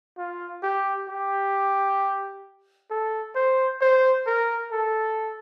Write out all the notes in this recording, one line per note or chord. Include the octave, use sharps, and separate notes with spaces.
F4
G4
G4
A4
C5
C5
A#4
A4